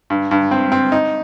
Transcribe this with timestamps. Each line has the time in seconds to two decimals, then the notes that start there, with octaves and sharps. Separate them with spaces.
0.10 G2
0.31 G2
0.51 C4
0.72 C4
0.92 D#4